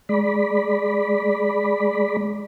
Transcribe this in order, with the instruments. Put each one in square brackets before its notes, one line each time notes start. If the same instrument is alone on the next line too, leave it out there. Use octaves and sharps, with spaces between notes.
[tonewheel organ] G#3 D5 B5